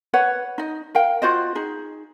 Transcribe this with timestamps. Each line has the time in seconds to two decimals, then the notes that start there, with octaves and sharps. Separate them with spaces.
0.14 B4 C#5 F#5
0.58 D#4 D#5
0.95 A#4 F5 G5
1.22 F4 F#4 C5 D#5
1.55 D#4 G#4